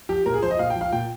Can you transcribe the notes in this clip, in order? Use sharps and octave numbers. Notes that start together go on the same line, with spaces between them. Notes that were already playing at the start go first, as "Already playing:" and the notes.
F3 G4
A#2 A#4
G#4
F3 C5
D#5
A#2 F5
G5
F3
F5
A#2 G5